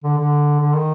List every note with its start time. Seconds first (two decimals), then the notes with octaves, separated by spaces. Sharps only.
0.04 D3
0.18 D3
0.60 D3
0.74 D#3